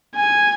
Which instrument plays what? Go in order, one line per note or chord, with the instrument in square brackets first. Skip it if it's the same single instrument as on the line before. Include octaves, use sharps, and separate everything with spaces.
[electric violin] G#5